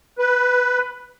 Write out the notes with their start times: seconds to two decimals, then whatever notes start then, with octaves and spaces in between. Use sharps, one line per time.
0.18 B4